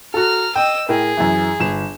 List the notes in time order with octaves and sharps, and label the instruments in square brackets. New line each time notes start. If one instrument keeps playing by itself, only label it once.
[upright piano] F#4 A4 [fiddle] A#5 F6
[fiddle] D#5 E6 [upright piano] G5
[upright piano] A2 A#4 G5 [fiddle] G#4
[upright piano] F#2 E3
G1 E7